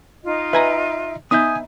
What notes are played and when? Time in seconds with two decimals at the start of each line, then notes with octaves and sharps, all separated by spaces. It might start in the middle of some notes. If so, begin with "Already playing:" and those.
0.24 D#4 F4 D#5
0.53 B4 E5 G#5 A#5
1.31 B3 D#4 E5 G#5 D#6 G6